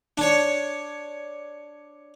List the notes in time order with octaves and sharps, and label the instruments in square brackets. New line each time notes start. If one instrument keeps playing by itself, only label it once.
[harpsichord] D4 C#5